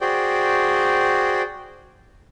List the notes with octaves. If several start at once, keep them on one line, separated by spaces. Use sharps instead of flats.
F#4 G#4 C5 D5 G5